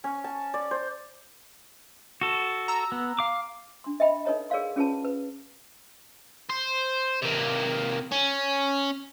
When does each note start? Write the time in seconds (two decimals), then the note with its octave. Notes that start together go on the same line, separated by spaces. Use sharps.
0.04 C#4
0.24 A5
0.54 D5
0.71 C5
2.21 F#4 A4
2.68 A#5 E6
2.92 B3
3.19 F5 D6
3.84 D4 C6
4.00 D#5 E5 G5 B5
4.25 D#4 A4 B4 C#5 D#5 A#5
4.50 G#4 A#4 C#5 D5 F5 C6
4.76 C#4 F4 G#4 B4 C#5 A5
5.05 B4
6.50 C5
7.22 C3 A#3
8.12 C#4